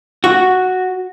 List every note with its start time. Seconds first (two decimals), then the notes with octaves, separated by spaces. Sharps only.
0.24 F#4